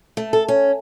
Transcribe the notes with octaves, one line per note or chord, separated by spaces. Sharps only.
A3
A4
C#4